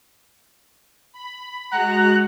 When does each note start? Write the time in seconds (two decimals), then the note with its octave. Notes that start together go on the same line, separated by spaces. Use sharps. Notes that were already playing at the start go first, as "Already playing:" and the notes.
1.13 B5
1.72 G#3 F#4 F#5 A#5 F#6